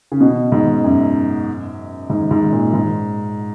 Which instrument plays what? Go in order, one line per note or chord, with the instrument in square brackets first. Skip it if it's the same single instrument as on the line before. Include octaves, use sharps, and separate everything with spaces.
[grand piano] C#3
B2
G#2
F#2
G#2
G#2
A#2
G#2